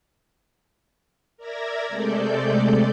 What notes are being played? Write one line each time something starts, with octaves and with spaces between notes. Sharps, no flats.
A#4 D5 E5 G#6 A#6
C3 G#3 A3 A4 D5 G6